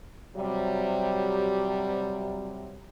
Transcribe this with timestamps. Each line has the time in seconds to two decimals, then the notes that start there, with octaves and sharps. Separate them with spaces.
0.37 C3 F#3 G3